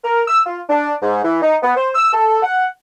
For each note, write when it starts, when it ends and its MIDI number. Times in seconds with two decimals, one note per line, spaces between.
0.04 0.22 70
0.28 0.41 88
0.46 0.60 65
0.69 0.94 62
1.02 1.19 44
1.24 1.38 52
1.42 1.56 63
1.63 1.72 59
1.76 1.90 72
1.95 2.10 88
2.13 2.39 69
2.42 2.65 78